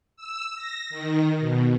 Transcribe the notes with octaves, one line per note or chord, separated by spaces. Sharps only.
E6
A#6
D#3
B2